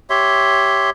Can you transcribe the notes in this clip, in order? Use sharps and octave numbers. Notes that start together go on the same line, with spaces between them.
G4 C#5 E5 C6